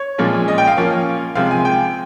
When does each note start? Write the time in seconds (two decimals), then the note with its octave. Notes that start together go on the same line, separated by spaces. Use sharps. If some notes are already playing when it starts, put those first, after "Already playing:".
Already playing: C#5
0.18 A#2 F3 G#3 C#4
0.48 D#5
0.58 G5
0.67 F5
0.77 F3 A#3 C#4
1.35 C3 F3 G#3 C4 F5
1.51 G#5
1.65 G5